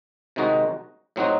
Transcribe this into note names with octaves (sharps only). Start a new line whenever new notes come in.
C3 D#3 G#3 D#4 F#4
A2 F#3 C4 D#4 F#4